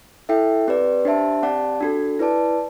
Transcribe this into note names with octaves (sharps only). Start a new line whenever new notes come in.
E4 A4 E5 G5
C4 G4 B4 D5
D4 G4 C5 E5 A5
C4 G4 D5 F#5 A5
D4 F#4 A4
E4 B4 D5 A5